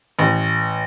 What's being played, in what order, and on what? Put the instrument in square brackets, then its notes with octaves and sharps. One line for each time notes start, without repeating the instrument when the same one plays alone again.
[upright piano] A1